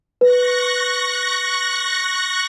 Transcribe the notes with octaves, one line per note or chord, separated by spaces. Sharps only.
B4 C#6 F#6 A#6